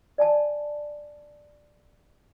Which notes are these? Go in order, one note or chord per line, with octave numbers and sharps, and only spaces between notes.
D5 G#5 A5